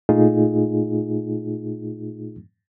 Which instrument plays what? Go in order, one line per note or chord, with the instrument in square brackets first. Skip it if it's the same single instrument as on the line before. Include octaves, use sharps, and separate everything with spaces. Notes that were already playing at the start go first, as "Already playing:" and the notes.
[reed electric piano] A#2 A3 D#4 F4 G#4